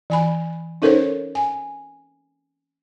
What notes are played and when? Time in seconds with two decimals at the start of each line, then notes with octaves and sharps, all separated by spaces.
0.10 E3 G#5 B5
0.82 C#4 D#4 A4 A#4 C5 C#5
1.35 G#5